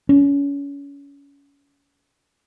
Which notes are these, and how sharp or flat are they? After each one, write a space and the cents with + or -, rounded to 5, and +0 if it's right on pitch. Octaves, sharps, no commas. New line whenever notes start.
C#4 +30